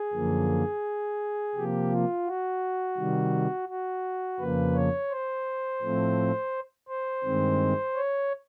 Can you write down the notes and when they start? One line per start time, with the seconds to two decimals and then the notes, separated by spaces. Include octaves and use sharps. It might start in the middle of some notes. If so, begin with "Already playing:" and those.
Already playing: G#4
0.13 F#2 D3 F3 A#3
1.55 C3 F3 A#3 G4
1.91 F4
2.26 F#4
2.97 C3 D#3 G3
3.69 F#4
4.40 F2 C#3 F3 A#3 B4
4.75 C#5
5.11 C5
5.82 A2 F3 A3 C4
6.88 C5
7.24 G2 D#3 G#3 C4
7.95 C#5